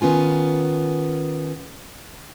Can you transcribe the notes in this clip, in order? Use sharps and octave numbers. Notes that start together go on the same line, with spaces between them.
D#3 B3 C#4 F4 G#5